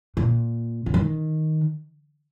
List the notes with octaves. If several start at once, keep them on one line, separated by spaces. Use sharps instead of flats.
A#2
C#3
D#3